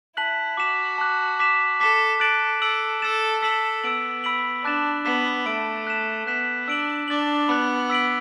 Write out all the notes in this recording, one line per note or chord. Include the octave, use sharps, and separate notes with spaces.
E4 A5 F#6 B6 F#7
F#4 D6 B6 E7
A5 D6 F#6
D6 B6 E7
A4 D6 B6 E7
A4 F#6 A6 D7 F#7
A4 E6 D7 F#7
A4 E6 A6 E7
A4 E6 B6 F#7
B3 E6 D7 F#7
B5 E6 B6 D7 F#7
D4 A5 D6 F#6 A6 E7
B3 D6 B6 E7
A3 E6 D7 F#7
F#6 B6 E7
B3 F#6 B6 E7
D4 E6 D7 F#7
D4 D6 A6 F#7
B3 B5 D6 F#6
E6 B6 D7 F#7